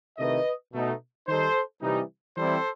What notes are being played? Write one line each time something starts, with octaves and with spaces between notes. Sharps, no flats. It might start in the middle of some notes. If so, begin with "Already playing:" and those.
C3 D#3 A3 E4 B4 D#5
B2 A3 D#4
D#3 G3 D#4 A4 C5
C3 E3 G3 D#4
E3 G3 C4 E4 A4 C5